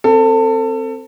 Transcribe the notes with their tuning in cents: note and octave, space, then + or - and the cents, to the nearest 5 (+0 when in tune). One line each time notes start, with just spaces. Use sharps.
C4 +0 A4 +25